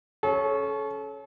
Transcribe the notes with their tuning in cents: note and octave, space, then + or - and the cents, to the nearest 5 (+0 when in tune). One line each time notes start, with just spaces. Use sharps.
C#4 +0 A4 -35